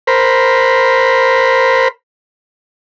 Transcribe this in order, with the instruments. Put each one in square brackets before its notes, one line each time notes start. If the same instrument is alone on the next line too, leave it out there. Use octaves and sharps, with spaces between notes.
[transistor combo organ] A#4 C5 B5